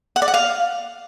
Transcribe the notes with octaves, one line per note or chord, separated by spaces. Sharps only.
F#5
D5
F#5
F5